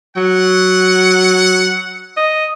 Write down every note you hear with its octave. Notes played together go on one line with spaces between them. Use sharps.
F#3 F#5
D#5